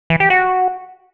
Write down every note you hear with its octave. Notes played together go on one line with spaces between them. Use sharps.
E3
G4
F#4